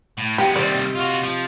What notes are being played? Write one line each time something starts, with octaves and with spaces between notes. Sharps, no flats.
A2
G#3 B3 G4
C3 D#3 G3 D5
D#5
F4 F#4
F3